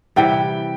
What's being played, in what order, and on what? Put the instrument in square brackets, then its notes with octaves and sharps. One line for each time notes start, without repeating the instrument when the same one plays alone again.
[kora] C3 E3 G3 [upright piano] G5